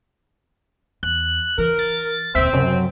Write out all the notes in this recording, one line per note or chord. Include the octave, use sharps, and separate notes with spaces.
E2 F#6
E3 A#4
A6
D#1 D2 C4 E5
F#2 C3